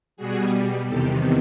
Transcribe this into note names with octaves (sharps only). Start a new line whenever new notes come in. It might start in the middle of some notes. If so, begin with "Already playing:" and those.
B2 G3 F#4 G#4
E2 C3 D#3 G4 A4